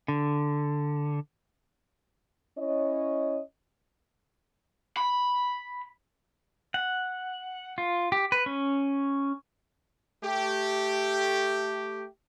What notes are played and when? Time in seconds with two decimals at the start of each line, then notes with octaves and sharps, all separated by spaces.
0.08 D3
2.58 C#4 E4 C#5 D#5
4.97 B5
6.74 F#5
7.78 F4
8.12 G4
8.32 B4
8.46 C#4
10.23 A3 G4